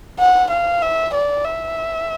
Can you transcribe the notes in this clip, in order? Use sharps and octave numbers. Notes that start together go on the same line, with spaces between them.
F#5
F5
E5
D5
E5